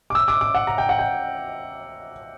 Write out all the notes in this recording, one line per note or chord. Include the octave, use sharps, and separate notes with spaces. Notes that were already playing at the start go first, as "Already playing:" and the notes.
D6
E6
D6
D6
F#5
A#5
G5
F#5
G5